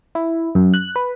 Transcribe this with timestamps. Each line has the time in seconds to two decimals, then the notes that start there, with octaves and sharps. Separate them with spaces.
0.15 E4
0.55 F#2
0.74 F#6
0.96 B4